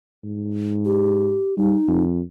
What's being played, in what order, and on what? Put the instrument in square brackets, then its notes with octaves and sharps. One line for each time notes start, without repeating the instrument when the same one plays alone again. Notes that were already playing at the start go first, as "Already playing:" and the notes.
[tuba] G#2
[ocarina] G4
[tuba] G3 [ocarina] D#4
[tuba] F2